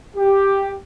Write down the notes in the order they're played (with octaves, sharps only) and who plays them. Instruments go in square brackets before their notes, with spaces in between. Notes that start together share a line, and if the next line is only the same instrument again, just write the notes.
[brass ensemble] G4